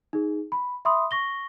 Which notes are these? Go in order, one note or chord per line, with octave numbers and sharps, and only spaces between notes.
D#4 G#4
B5
E5 B5 C6 D#6
C#6 A#6 G7